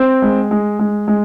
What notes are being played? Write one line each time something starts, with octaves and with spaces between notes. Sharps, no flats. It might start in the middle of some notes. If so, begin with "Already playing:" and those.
Already playing: C4
G#3
G#3
G#3
G#3